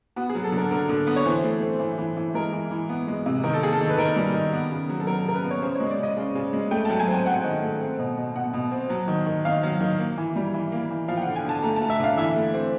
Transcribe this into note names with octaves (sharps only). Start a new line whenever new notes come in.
B3 F#4
G#4
F#3
A4
D3
A#4
D3 A#4
D3
B3
C#5
E3 C5
A3
C4
E3
E3
E3
G#3 A#4
E3
E3
B3
G#3
C3
D#3 A#4
A4
A#3 G#4
A4
D#3
B4
D#3 A#4
G3
D#3
B3
C#3
F#3
A4
F#3 A#4
C#3 A#4
B4
B3
C#5
C#3 C5
C#5
G#3
D5
C#3 D#5
C#3
C#3
G#3
A3 G5
F#3 A5
G#5
C4 G5
C4 F#5
D#3
A3
C4
B2
B2
B2 F#5
B2
C4
F#3
D#3
D#3
D#3 F5
F#3
D#3
A#3
E3
G3
E3
A#3
E3
F3 F5
G5
D3 F#5
G#5
D3 A5
A3 A#5
A5
A3
E5
D3 F5
E3 E5
A3
C4